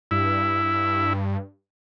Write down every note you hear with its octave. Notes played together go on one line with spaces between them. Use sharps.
G2 E4